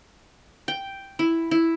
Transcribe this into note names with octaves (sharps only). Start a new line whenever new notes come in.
G5
E4
E4